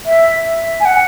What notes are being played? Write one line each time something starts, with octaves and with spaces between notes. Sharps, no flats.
E5
G#5
F#5